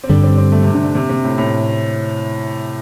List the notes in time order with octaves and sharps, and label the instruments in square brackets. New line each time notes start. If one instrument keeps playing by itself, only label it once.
[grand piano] C4
[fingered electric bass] G2 D3 G3 [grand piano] D4
[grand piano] C4
C4
A3
C3
D3
D3
C3
C3
A2
A2